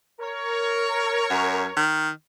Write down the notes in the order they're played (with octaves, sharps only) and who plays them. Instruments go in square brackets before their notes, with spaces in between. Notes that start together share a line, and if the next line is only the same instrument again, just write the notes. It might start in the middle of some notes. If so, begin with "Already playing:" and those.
[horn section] A#4 C#5
[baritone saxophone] F#2
D#3